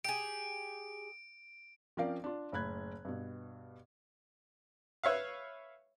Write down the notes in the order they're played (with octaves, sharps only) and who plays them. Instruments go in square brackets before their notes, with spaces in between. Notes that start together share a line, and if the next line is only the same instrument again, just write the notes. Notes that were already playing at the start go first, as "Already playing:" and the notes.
[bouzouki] G4 G#4 [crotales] D7
[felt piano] F3 C4 C#4 A#4 D5 F5
D4 F4
F#1 A2 B5 F#6 G#6
G2 B2
[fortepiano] B4 C#5 E5 F5